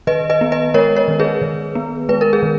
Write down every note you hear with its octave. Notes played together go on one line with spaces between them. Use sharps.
D#3 B4 D#5
B4 D#5
B3
B4 D#5
G#3 A#4 C#5
A#4 C#5
D#3
G#4 B4
D#3
B3
G#3 B4
A#4
G#4
D#3